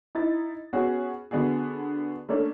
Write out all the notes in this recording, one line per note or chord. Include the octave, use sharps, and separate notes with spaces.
D#4 E4 A6
B3 C#4 F#4 G#4
D3 B3 D4 F#4 G#4
A3 A#3 C#4 D4 A4